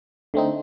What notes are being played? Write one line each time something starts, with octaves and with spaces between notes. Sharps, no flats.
D3 A3 C4 D#4